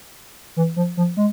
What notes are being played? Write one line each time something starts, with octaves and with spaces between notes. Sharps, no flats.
E3
F3
F3
G#3